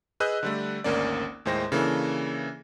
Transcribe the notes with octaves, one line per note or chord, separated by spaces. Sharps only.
G#4 B4 D#5 E6 F#6 G6
D3 G3 A3
G#1 D2 A#3 C#4 D5
D#2 A2 G#3 C5 G5 A#6
C#3 E3 A#3 D4 A4